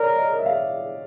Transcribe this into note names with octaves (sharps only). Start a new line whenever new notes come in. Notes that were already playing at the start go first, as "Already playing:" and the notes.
Already playing: A#4 C#5 D5
D#5
E5
F5